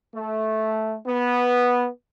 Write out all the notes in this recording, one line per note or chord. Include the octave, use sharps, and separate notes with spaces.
A3
B3